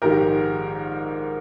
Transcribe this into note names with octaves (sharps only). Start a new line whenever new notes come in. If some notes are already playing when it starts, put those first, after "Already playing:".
A#1 G#2 D#3 G4 A#4